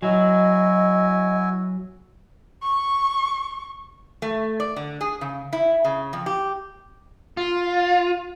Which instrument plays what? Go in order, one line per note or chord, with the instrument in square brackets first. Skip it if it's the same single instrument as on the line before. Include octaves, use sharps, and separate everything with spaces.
[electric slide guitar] F#3 [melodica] E4 F#4 G#5 [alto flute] D#5
[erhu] C#6
[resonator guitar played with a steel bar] A3
D5
D3
G#4
C#3
E4
C#3
F2
G4
[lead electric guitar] F4